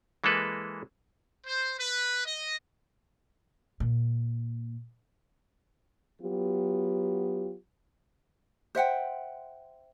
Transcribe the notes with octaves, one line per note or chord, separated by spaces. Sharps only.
E3 G#3 A#3 A4 B4
C5
B4
D#5
A#2
F#3 B3 F4 G4
C5 E5 F#5 G5